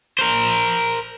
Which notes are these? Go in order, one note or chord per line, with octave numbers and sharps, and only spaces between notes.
A#4 C5